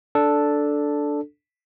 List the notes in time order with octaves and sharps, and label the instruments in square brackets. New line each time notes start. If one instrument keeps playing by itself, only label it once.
[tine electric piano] D4 A4